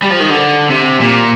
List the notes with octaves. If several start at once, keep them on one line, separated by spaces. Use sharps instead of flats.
G3
F3
D#3
D3
C3
A#2